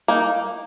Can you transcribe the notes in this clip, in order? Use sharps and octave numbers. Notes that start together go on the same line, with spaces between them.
A#3 D#4